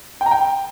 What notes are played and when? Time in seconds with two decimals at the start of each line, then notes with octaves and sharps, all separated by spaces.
0.21 G5
0.26 A#5
0.31 G5